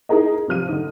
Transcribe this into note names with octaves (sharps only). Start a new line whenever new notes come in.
D#4 E4 G#4 A#4 D#5
C3 F3 F6 D#7
D3 D#4